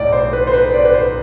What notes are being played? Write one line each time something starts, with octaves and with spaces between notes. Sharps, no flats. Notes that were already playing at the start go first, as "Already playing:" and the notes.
Already playing: B1 A2 D5
C5
B4
C5
B4
D5
B4
C5